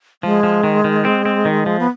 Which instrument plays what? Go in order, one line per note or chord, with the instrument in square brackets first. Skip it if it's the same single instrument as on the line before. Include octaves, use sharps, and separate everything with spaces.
[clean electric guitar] F3 [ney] G#3
[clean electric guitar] F3
D#3
D#3
C4
C4
D#3
F3
[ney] B3